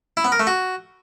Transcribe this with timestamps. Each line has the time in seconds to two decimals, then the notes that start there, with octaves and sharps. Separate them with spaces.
0.17 E4
0.25 B3
0.32 A#4
0.40 A3
0.47 F#4